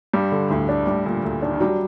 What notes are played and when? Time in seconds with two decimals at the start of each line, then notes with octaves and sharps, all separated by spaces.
0.13 G2 G3
0.32 D3
0.50 D2 A2
0.69 D4
0.87 A2 G3
1.05 A#2 D3
1.24 D2
1.42 D#3 D4
1.53 D#3
1.60 F#3 G3